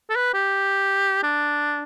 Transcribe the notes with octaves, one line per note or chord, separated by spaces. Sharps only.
A4
B4
G4
D4